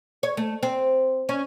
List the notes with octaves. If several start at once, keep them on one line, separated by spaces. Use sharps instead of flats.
C#5
A3
C4
C#4